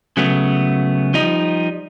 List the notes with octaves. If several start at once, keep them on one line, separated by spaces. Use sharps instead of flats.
C#3 F#3 A3 B3
F3 G3 D#4